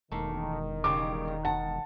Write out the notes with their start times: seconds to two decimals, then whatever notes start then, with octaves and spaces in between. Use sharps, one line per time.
0.11 E1 D#3 A3 A#3
0.84 C#3 G3 G#3 D6
1.45 F#5 A5